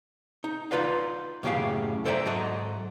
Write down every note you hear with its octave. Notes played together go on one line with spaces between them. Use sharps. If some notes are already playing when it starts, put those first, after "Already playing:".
D#4
D#4 F4 B4 D5 F5
F#2 A2 C#3 G4 G#4 F5
A4 C5 D5 E5 F#5 A#5
G#2 F#3 A4 D#5